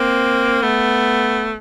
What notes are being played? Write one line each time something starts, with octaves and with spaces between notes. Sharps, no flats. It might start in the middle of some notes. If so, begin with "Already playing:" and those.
Already playing: A#3 C4
A3 B3